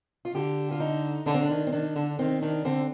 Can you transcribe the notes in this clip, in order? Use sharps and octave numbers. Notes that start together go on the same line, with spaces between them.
F4
D3 G4
F4
D#4
D3 D4
C4
D4
D#3
C4
D#3 D4
D3
D#3 C4
D#3 D4
D3 C4